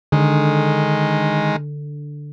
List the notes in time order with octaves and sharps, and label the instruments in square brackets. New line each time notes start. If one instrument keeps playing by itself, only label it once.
[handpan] D3 [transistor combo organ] D#3 G#3